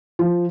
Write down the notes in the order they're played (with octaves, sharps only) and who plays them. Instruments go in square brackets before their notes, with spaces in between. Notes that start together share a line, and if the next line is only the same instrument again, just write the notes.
[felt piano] F3